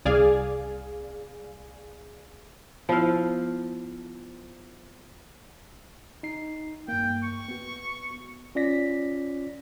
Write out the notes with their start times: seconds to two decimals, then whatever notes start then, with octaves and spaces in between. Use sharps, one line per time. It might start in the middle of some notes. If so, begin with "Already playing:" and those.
0.05 C2 G#4 D5 F5 G#5
2.89 F3 B3 E4 F5
6.23 D#4 C7
6.88 G2 A#3 G5
7.23 C#6
7.49 B3 F#4
8.55 C#4 F4 D5 A#6 B6